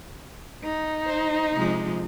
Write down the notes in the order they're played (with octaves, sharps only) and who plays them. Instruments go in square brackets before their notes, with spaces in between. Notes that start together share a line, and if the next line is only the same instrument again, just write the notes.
[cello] D#4
[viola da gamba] C5
C3 F3 G#3